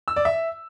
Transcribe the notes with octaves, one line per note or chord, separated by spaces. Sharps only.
E6
D5
E5